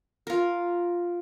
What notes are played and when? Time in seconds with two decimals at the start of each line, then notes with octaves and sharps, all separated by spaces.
0.27 F4 A#4